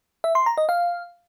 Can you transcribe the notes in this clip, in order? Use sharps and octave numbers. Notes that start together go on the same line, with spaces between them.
E5
C6
A#5
D#5
F5